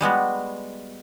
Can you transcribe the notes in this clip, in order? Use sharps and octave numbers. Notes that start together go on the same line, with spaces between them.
G3 G#3 B3 F#4